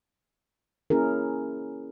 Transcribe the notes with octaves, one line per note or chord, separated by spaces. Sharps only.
A#3 C#4 E4 G#4 A#4